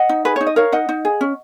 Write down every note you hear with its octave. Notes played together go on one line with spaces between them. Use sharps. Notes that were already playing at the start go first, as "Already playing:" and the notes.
Already playing: D#5 F#5
D#4
G#4 B4
D#4 C#5
D#5
A#4 C#5 F5
D#4 D#5 F#5
D#4
G#4
C#4